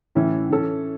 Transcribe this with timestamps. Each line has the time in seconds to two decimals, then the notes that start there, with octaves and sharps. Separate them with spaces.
0.15 A2 E3 C#4 E4
0.51 E3 C#4 A4